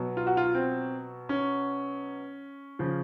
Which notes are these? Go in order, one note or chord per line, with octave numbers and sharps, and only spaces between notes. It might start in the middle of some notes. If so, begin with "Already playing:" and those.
Already playing: B2 F#3
F4
F#4
F4
C4
C#4
C#3 F3